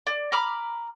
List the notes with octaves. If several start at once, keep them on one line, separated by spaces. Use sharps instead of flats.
D5
A#5 B5 D6 F6